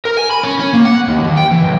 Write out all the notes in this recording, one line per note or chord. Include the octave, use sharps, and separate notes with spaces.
A#4
G#5
B5
C#4
C#4
A#3
F#5
D#2
D#2
G5
E3
B1